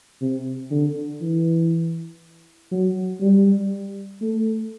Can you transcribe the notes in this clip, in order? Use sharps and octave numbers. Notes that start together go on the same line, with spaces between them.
C3
D3
E3
F#3
G3
A3